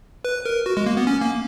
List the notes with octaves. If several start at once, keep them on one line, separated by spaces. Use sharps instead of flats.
B4
A#4
F#4
G#3
A#3
B3
C#4
A#3